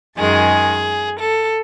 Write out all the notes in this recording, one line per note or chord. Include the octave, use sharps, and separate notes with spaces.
F#2 D#3 G#3 G#4
A4